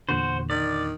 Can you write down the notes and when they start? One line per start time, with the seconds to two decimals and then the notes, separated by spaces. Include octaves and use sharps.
0.09 E2 A#2 D3 F#4 C5
0.50 D#3 D5